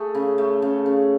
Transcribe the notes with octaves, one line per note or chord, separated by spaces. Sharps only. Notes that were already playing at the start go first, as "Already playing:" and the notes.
Already playing: A3 G#4
C#3
A3
C#3
C#3